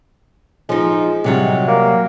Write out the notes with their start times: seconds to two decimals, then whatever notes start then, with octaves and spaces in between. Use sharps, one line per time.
0.69 F3 G#3 D#4
1.24 C3 F#3 G3
1.68 A#3